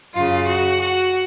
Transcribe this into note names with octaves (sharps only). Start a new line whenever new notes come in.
F#2 C#3 F4
F#4
F#4